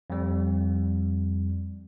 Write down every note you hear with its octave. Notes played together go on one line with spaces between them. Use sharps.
F2 G3